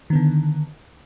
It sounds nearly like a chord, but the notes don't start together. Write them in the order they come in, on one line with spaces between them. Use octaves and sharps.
D#3 B3 D3